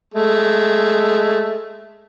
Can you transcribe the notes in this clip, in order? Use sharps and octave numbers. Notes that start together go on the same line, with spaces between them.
G#3 A3